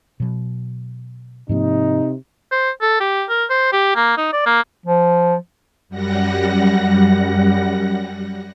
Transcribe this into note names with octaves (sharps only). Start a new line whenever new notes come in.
B2 F#3
G#2 C3 F3 A#3 D#4
C5
A4
G4
A#4
C5
G4
A#3
D#4
D5
A#3
F3
F#2 G3 F#5 A#6